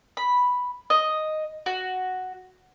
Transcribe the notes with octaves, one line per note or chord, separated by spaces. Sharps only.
B5
D#5
F#4